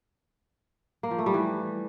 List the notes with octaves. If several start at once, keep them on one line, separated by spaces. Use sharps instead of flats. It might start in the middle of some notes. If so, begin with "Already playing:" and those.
A#3
F3
A3
G3
E3